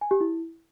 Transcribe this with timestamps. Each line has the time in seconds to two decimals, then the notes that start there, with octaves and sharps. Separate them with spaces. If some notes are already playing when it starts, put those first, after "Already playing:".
0.01 G#5
0.11 G4
0.20 E4